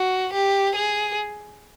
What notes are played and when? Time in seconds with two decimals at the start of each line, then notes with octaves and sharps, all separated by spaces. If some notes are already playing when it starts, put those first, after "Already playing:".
Already playing: F#4
0.32 G4
0.75 G#4